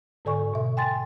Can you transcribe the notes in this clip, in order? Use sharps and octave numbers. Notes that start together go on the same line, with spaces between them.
G#2 D3 A4 D5 G#5 C#6
B2 E5
G5 G#5 C6 A6